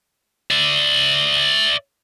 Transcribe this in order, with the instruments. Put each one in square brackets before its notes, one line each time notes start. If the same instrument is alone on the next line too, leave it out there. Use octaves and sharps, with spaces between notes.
[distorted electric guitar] D5 E5